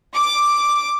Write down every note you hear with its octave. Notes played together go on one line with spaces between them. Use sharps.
D6